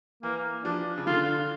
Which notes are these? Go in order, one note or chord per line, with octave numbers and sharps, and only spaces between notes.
E3 A#3
F3 D4
C#3
D3 F4